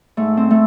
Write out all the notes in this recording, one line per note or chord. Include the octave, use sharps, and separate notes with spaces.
G#2 A3
C4
A3